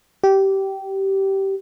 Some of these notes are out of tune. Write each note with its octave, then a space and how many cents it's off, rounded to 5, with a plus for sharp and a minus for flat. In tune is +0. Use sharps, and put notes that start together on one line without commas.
G4 -15